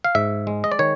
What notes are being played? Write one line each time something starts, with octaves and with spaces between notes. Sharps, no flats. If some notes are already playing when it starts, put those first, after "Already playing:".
F5
G#2 E5
G#3
D#5
D5
D#3 C#5